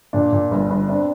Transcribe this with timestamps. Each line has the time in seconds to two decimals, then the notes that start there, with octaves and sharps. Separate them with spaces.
0.13 A#2 D4
0.32 A#2
0.51 G1
0.70 G1
0.88 C4 D4